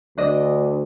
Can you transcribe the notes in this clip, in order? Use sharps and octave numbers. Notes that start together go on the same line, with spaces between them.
D2 D4 D#5